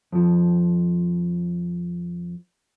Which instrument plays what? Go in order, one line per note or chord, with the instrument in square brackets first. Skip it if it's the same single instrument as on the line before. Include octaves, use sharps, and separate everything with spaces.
[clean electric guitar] F2 F3